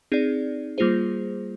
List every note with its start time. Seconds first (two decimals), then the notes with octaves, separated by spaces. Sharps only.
0.12 C4 D#4 G#4 D5
0.78 G3 A#3 F4 G#4 C5